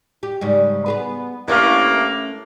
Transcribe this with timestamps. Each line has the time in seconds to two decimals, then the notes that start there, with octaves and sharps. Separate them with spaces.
0.23 G4
0.41 G#2 C#3 G3
0.86 B3 G#4 B4
1.48 G2 A3 A#3 C#4 E4